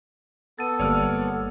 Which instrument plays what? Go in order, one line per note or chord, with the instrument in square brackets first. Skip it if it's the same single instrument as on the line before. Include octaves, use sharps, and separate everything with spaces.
[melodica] B3 A4 [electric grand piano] A6 D#7
[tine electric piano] G1 G3 A#3 [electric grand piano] C#5 D5 F6